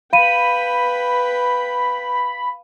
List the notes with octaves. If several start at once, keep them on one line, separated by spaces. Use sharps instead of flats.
B4 F5 G5 B5 D#7